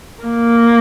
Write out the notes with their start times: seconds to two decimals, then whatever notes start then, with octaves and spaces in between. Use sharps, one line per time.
0.23 A#3